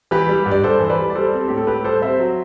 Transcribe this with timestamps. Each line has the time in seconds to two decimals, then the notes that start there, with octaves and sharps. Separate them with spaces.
0.11 E3 G4 B4
0.29 G3
0.46 G2
0.51 D5
0.64 G2 A4 C5
0.80 E3 C5
0.89 B4 D5
0.98 G3
1.10 D5
1.15 G3 A4 C5
1.33 C4
1.48 A2 G4
1.57 A4
1.67 A2 G4 B4
1.84 G3 A4 C5
2.02 C4 C5 E5
2.19 F#3